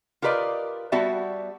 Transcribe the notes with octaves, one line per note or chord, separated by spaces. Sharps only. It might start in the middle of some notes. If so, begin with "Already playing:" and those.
F4 G4 A#4 B4 D5 D#5
G3 B3 F#4 E5 A5